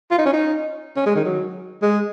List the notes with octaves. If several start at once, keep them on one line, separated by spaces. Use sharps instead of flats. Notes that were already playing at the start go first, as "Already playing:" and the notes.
F4
D#4
C#4
D#4
C#4
G#3
D#3
F#3
G#3